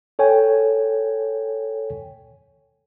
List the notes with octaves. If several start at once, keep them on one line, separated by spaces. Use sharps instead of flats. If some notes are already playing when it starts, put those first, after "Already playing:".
A4 C#5 G5 G#5